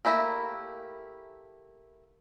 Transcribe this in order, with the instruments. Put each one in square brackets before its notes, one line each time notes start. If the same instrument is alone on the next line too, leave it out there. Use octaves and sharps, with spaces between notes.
[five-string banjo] A3 A#3 E4 G4 A#4